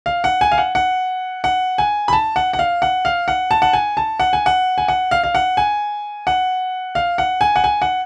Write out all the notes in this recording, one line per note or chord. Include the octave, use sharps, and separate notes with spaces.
F5
F#5
G#5
F5
F#5
F#5
F#5
G#5
B5
A5
F#5
F#5
F5
F#5
F5
F#5
A5
F#5
G#5
A5
F#5
G#5
F#5
G#5
F#5
F5
F5
F#5
G#5
F#5
F5
F#5
G#5
F#5
G#5
F#5